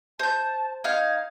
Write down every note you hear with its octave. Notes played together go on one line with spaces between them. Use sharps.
C5 A5 G6
D#4 F5 G#6